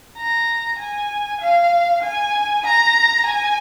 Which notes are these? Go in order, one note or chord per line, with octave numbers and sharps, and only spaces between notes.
A#5
G#5
F5
G#5
A#5
G#5